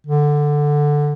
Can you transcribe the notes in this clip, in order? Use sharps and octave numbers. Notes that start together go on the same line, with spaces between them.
D3